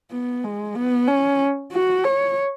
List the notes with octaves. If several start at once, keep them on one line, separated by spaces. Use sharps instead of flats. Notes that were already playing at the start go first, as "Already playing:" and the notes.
B3
G#3
B3
C#4
F#4
C#5